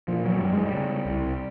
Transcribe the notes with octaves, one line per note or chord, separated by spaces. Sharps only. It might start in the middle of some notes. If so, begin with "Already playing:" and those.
A#2 F3
F#3
F#2 G3
G#3
G3
C#3
C2